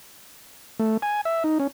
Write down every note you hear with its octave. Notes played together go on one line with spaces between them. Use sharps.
A3
G#5
E5
D#4
C#4